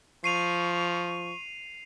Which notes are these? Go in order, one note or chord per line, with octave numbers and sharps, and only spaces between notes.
F3 C#6 C7 D#7 F7